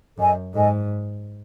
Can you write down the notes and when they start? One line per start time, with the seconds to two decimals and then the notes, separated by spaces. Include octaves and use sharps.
0.17 F#2 A4 D#5 G#5
0.54 G#2 A4 D#5 G#5